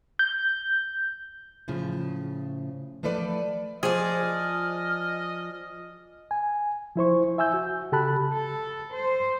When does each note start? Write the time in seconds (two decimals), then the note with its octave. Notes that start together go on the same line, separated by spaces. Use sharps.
0.19 G6
1.68 A2 C#3 F3
3.03 F3 A3 A4 B4 D5
3.83 F3 G#4 D5 D#5 F6
6.31 G#5
6.96 F3 E4 C5 C#6
7.38 E5 G#5 E6 G6
7.54 F#4
7.92 C#3 G4 A4 A5 B5 F#6
8.33 A4
8.92 C5